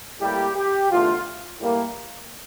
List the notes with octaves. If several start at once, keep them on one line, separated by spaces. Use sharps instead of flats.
A2 G3 A#3 G4
G4
E2 D3 A3 F4
A2 G3 A#3